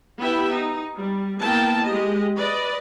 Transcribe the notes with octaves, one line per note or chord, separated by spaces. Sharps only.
B3 E4 G4 E5 G5
D#4
G3
A#3 B3 E4 G5 A5
G#3 G4 D#5
B4 D5 D#5